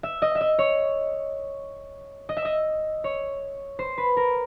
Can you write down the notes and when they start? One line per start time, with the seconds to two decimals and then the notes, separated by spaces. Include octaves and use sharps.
0.03 E5
0.22 D#5
0.35 E5
0.41 D#5
0.59 C#5
2.29 D#5
2.37 E5
2.45 D#5
3.04 C#5
3.79 C5
3.98 B4
4.17 A#4